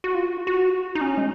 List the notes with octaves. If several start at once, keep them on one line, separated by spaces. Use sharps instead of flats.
F#4
F4
F#4
D#4
C#4
G#3